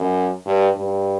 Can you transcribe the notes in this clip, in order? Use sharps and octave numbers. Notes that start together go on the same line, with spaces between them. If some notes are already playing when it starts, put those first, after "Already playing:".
Already playing: F#2
G2
G2